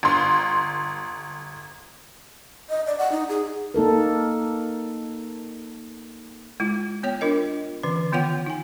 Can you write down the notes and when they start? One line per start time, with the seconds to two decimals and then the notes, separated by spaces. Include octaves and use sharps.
0.03 G1 C6
2.69 D#5
2.87 D5
2.98 F#5
3.12 D#4
3.29 G#4
3.74 A#3 D#4 A4 A#4
6.60 G#3 E4 F4
7.03 B3 C#5 G5
7.21 D4 F4 A#4 D#5
7.83 D3 E3 C#4 B4
8.12 D#3 B3 F4 C#5 F#5 G5
8.46 D#4 G#5